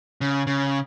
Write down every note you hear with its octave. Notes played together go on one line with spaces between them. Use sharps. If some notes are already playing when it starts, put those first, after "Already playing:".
C#3
C#3